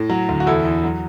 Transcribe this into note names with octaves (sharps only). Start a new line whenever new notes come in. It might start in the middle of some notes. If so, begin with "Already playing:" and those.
Already playing: A2
F#3
D2
F#4
E2 E4 A4
E2
F#3